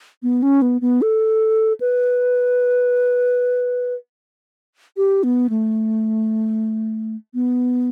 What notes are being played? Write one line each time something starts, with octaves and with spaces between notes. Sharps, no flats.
B3
C#4
B3
B3
A4
B4
G4
B3
A3
B3